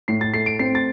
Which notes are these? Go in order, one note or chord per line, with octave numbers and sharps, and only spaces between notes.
A2 C7
A6
A3 C7
D7
C4 C7
A6